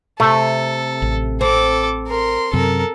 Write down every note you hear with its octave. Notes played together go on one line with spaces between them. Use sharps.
C3 A3 A4
A1
C4 A4 D6
A#4 C6
F#2 C3 A4 A#4